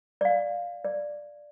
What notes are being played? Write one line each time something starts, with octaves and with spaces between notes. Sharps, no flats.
D5
F5
D5